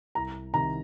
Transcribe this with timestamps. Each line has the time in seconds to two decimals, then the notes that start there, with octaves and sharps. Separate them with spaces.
0.15 C2 A#5
0.54 C3 D#3 A#5